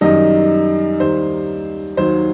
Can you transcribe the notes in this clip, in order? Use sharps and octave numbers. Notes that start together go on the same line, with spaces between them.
F#2 D#3 G3 D#5
D#2 D#3 G3 C5
D#2 D#3 F#3 C5